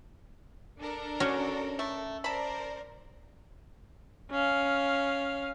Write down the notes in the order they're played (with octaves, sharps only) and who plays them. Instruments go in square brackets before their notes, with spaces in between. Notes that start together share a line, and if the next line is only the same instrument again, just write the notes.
[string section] D4 A4 A#4
[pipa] D3 F#4 C#6 [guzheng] C#4
[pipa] A3
[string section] A#4 C5 D5 [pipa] A5 B5
[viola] C#4 F5